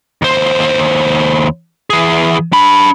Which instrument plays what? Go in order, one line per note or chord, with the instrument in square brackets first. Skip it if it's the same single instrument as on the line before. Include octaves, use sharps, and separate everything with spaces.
[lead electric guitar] D#2 C5
E3 G#4
D4 B5